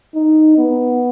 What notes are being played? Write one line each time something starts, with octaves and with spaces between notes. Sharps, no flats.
D#4
B3